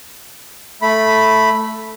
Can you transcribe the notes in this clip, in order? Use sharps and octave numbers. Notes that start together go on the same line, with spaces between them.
A3 B5